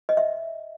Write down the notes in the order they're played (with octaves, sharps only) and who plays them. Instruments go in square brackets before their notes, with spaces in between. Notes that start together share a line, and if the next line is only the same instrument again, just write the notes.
[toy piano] D#5
E5